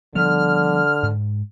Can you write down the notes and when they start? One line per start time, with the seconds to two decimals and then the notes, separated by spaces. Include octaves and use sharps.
0.15 D3 F3 G3 B3 F6
1.03 G#2